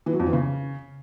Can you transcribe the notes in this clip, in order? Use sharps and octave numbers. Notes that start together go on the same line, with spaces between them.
E3
F#3
F2
E3
C#3